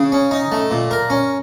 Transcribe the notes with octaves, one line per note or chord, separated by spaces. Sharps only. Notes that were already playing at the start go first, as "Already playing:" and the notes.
Already playing: C#3
C#4
D#4
A3
A#2
A#4
C#4